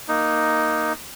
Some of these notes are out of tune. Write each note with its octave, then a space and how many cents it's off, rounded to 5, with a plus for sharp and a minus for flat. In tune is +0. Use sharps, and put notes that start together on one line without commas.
A#3 +0 D#4 +0